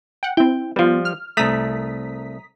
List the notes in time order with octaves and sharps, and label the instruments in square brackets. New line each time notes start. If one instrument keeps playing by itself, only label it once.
[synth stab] F#5 G5
[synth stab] C4 E4 [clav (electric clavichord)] G5
[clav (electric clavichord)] F3 G3 [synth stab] B3 F4
[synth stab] F6
[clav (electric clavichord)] C2 A3 [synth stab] A#5 D#6 B6